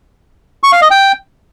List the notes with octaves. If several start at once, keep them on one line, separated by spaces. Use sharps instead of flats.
C#6
F5
D#5
G5